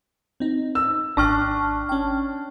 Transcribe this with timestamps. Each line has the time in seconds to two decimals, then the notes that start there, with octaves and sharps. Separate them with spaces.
0.40 C4 D#4
0.75 E6
1.17 G#1 D4 G5 A5 C#6 F6 F#6
1.89 C#4 G5